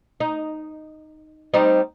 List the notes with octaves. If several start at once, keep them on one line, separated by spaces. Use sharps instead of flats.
D#4
G3 C4 D#4